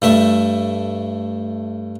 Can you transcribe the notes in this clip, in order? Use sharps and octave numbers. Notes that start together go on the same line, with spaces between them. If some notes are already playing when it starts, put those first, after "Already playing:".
G2 A3 E5